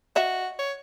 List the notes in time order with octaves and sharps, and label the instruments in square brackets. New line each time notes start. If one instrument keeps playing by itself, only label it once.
[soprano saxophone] F#4 [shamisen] D#5 E5
[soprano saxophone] C#5